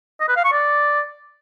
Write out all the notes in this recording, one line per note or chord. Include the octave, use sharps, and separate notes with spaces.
D#5
B4
F5
C#6
D5